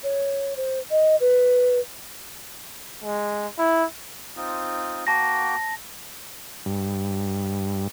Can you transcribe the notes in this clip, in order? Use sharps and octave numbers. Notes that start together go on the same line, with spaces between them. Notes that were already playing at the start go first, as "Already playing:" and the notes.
C#5
C5
D#5
B4
G#3
E4
C4 D#4 F4
A#3 F#4 G5 A5 A#6
G2